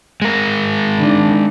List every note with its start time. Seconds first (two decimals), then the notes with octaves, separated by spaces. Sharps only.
0.22 G#3 A#4
0.98 D#3 D4